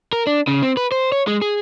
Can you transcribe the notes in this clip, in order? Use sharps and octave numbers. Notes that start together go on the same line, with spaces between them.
A#4
D4
C#3
C4
B4
C5
C#5
G#3
G#4